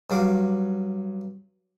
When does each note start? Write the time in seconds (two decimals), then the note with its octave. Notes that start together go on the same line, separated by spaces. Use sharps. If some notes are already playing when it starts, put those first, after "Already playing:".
0.10 G2 F#3 F5 D6